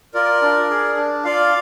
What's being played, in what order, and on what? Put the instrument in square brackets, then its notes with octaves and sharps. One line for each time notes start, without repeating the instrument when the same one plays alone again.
[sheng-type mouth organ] F4 A#4 D5
D4
G#4
D4
F4 D5 F5